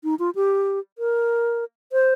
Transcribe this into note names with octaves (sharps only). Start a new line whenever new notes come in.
D#4
F4
G4
A#4
C5